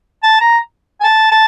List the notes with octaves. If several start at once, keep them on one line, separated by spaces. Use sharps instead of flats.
A5
A#5
G#5
A5
A5